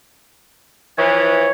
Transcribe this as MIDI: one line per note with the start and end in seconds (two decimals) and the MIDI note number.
0.98 1.49 52
0.98 1.49 53
0.98 1.52 73